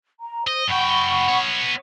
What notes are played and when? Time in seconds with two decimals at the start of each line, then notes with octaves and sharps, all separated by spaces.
0.21 A#5
0.47 C5 D#5
0.68 F#2 F#5 G5 B5 C#6
1.28 B3 C#5